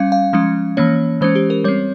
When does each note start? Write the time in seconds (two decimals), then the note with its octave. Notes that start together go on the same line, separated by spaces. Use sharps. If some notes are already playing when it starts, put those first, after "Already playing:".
Already playing: G3 C#4 F5
0.12 F5
0.33 F3 G#3 C#4
0.77 E3 A#3 C#4 C#5
1.21 E3 G#3 C#4 C5
1.35 G4
1.50 A#4
1.64 G3 C4 C#5